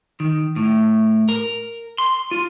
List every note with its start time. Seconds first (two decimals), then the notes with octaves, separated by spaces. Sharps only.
0.20 D#3
0.56 A2
1.29 A#4
1.98 C6
2.31 F4